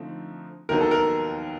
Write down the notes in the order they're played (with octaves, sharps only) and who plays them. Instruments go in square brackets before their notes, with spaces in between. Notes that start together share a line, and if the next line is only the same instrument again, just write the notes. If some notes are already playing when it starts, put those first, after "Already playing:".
Already playing: [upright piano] D3 F3 A3 C4 D#4
[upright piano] D#2 D#3 F#3 B3 [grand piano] A#4
[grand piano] A4
A#4